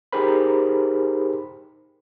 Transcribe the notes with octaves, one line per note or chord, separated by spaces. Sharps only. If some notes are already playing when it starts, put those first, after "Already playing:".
D#4 G4 G#4 A#4 C5 B5